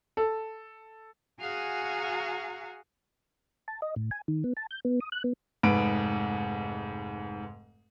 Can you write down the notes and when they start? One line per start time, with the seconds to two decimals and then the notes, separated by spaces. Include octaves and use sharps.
0.17 A4
1.40 F#4 G#4 F5 F#5 G#5 A#5
3.68 A5
3.82 D#5
3.96 A2
4.11 G#5
4.28 D#3
4.44 B3
4.57 A5
4.71 G6
4.85 B3
5.00 D#6
5.12 F#6
5.24 B3
5.63 F1 G#2 B4 D7